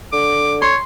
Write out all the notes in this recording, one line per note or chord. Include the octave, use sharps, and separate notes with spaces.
D3 D6
C#5 C6